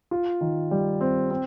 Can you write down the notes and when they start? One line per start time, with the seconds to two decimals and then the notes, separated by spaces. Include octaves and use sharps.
0.11 F4
0.41 D#3
0.71 G3
1.01 C4
1.31 C4